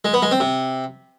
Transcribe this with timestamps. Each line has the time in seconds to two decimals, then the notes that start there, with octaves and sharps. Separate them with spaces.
0.05 G#3
0.14 B3
0.22 G#3
0.31 C4
0.40 C3